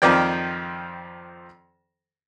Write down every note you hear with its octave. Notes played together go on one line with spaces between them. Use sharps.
F2 D#3 F3 D5 G5